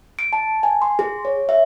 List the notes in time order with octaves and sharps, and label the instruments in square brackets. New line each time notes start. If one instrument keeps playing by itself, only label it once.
[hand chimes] D7
A5
G#5
C6
G#4
C#5
E5